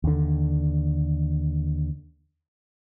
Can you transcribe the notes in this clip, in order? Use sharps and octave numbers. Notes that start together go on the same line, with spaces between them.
D#2 D3